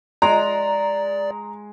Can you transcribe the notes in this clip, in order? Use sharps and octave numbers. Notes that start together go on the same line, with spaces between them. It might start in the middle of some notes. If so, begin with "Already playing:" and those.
G#3 D5 A#5